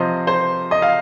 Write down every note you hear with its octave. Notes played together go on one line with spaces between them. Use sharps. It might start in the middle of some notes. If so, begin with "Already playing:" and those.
Already playing: C3 F3 C5 D#5
C5
D#5
F5